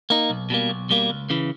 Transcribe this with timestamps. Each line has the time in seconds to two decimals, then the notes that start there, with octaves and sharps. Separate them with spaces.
0.10 A#3 D#4
0.30 B1
0.50 B2 G3 A#3
0.69 B1
0.90 B2 G3 A#3
1.10 C#2
1.30 C#3 E3